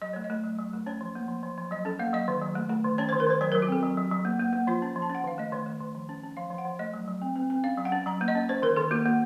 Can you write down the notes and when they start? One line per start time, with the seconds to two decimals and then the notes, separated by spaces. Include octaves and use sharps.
0.02 F#3 D#5
0.13 A3 C#5
0.24 D#5
0.30 A3
0.44 F#3
0.59 F#3
0.73 A3
0.86 C#4 C#5
1.01 F3
1.15 A#3
1.28 F3
1.43 F3
1.58 F3
1.71 F#3 D#5
1.85 C#4 A4
1.99 A#3 F5
2.13 F#3 D#5
2.28 D#3
2.41 F#3
2.55 A3
2.70 A3
2.84 D#3
2.98 C#4 C#5
3.09 C5
3.13 D#3
3.20 A#4
3.27 D#3 C5
3.41 F#3 C#5
3.52 A#4
3.55 F#3
3.62 F#4
3.68 C4 A4
3.83 F#3
3.97 F#3
4.11 F#3
4.25 A#3
4.40 A#3
4.53 A#3
4.67 F3 F4
4.82 C#4
4.96 F3
5.02 A5
5.10 C#4
5.15 F#5
5.24 D#3 F5
5.38 A3 D#5
5.52 D#3 C#5
5.66 A3
5.80 D#3
5.95 F3
6.09 C#4
6.23 C#4
6.37 F3 F5
6.50 F3
6.58 F#5
6.65 F3
6.79 A3 D#5
6.94 F#3
7.08 F#3
7.22 C4
7.36 C4
7.50 C4
7.64 C#4 F5
7.77 F#3
7.85 F#5
7.92 C#4
8.06 F#3 A#5
8.21 A#3
8.28 D#5
8.35 C#4
8.49 C#4 C5
8.62 D#3 A#4
8.76 D#3 A4
8.91 A#3 F#4
9.06 A#3